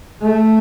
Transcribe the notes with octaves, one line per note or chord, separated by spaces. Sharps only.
A3